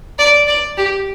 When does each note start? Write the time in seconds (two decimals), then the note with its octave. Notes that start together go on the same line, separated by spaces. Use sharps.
0.18 D5
0.47 D5
0.78 G4